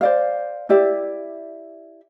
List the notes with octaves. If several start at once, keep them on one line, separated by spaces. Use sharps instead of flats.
C5 D5 F5
E4 G4 D5 E5